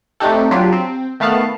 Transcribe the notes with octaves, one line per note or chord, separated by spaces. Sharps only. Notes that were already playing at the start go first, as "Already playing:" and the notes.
A3 C4 D4 D#4 G4 A4
F#3 D4 F4 G4
C4
D#3 A3 B3 F5 A5 F#6